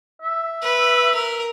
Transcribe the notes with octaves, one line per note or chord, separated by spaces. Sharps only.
E5
B4
A#4